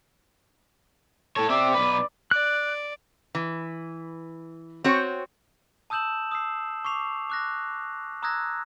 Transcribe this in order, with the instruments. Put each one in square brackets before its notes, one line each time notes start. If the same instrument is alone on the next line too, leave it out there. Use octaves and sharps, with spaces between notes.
[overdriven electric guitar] A3 C#5 [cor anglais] A4
[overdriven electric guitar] C4 E5 [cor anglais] D5
[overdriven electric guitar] B1 B4
[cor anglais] D5
[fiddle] D5 [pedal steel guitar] F#6
[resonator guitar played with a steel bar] E3
C4 F#4 C#5
[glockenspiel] A5 D#6 E6 G6 E7 F#7
D#6 E6 C7
C#6 D6 C7 F7
D6 F#6 A#6
A#5 D#6 E6 F#6 G#6 A#6